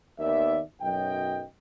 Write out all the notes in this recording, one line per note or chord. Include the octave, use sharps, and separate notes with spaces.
D#2 D#3 B3 D5 E5
B1 F#2 D#5 G5